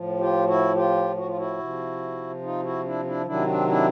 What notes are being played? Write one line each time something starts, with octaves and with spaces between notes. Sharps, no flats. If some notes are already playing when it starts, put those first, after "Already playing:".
Already playing: A2 F3
F4 G4
E4 F#4
F4 G4
F#4
F4
E4 F#4
C3 F3
D#4 F4
E4 F#4
D4 E4
D4 E4
C3 D#3 F#3 D4 E4
C4 D4
D4 E4